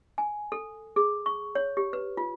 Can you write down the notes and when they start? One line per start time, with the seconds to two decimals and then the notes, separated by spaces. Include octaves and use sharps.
0.18 G#5
0.52 A4
0.96 G#4
1.26 C#6
1.55 C#5
1.77 G4
1.93 B4
2.17 F4